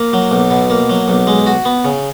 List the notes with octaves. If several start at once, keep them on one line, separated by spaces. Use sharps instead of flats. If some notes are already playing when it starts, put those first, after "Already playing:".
Already playing: A#3
F#3
B1
B2
A#3
F#3
B1
G#3
F#4
B3
C#3